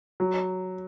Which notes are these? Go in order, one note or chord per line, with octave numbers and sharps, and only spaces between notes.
F#3